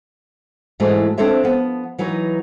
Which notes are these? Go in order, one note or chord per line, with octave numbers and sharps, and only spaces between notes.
G#2 E3 G#3 A3 F#4
C4 D4 A4 C5 C#5 E5
F3 B3
E3 F#3 D#4 B4